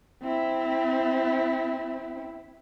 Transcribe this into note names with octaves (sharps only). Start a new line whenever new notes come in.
C4 E4